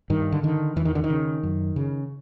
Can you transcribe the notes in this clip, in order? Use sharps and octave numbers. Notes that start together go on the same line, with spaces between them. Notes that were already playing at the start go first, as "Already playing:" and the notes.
G2 D#3
D3
D3 D#3
E2 E3
D#3
D3
D#3
C#3
F#2
C#3